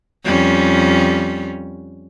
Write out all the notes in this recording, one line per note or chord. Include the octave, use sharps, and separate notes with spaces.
F2 G3 C#4